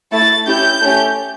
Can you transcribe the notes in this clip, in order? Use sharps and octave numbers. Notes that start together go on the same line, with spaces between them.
A3 E4 A4 A6
C#4 E4 G4 G6
A3 C#4 G4